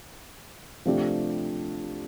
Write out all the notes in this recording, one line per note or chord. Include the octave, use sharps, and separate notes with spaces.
C3 F3 A3 D4 G4